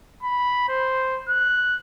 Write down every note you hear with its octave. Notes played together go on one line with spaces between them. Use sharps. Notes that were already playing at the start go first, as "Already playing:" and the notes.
B5
C5
F#6